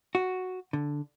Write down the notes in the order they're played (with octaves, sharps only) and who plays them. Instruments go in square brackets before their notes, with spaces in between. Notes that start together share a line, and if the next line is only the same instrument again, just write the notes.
[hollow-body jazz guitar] F#4
D3